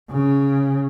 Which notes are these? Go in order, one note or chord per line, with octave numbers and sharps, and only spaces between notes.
C#3